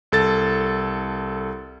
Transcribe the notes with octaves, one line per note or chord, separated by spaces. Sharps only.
C2 A4 A6